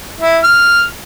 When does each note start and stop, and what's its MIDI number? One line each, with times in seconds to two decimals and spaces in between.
0.21 0.38 64
0.43 0.83 89